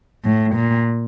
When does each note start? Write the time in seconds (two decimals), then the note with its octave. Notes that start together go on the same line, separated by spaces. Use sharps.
0.24 A2
0.55 A#2